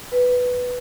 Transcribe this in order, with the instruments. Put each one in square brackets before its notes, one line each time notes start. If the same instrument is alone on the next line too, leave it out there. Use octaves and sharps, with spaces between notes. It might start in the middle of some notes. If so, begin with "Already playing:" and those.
[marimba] B4